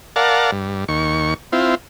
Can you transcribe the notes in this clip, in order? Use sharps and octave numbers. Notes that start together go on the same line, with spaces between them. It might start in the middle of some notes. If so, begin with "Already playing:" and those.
A#4 D5 F5 F#5 A5
G2
D#2 C#6
C4 E4 F4